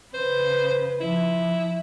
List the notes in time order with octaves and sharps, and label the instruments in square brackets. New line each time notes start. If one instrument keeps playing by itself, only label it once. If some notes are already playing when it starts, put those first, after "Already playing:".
[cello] C#3 B4 [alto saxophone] C5
[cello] F3 [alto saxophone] E4